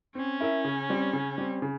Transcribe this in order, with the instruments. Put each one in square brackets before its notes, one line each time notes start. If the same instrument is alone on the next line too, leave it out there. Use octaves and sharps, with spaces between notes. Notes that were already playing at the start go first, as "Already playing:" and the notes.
[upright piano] C4 [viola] C#4
[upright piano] E4 A#4 E5
C#3
G3 C4
C#3
G3 C4
C#3